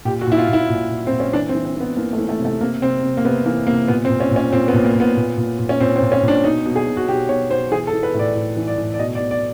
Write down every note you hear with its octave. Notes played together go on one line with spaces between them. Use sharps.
A#2 G4
F#4
A#2
E4
F4
A#2 E4
A#2
A#2
A#2 C4
C#4
E3 D4
C4
E3
C4
E3 B3
E3 A#3
A3
E3
A3
C3
A3
C3 A#3
C3 C4
C3
A#3
C3 B3
E3 A#3
C3 A#3
A#2 B3
C4
A#2
C#4
A#2
C#4
A#2 C4
B3
A#2
A#3
A#2
B3
A#2
A#2
A#2
C#4
A#2 C4
C4
A#2
C#4
A#2
D4
B2 D#4
B2
G#4
B2
F#4
B2 G4
B2 C#5
B2 C5
E3 G#4
A4
E3
B4
A2 D5
A2
E3
D5
A2
D5
B2 D#5
D5
B2
D5